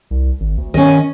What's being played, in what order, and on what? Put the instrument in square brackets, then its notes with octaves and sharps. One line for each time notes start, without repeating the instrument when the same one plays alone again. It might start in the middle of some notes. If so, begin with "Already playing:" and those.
[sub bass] C2
G#1
D2
[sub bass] D#3 [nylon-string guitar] C#4 D#5